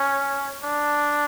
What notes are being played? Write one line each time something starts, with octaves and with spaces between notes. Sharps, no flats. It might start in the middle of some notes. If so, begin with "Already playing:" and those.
Already playing: C#4
D4